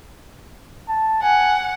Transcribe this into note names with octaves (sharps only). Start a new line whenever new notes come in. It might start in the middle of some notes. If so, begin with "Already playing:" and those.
A5
F#5 G#5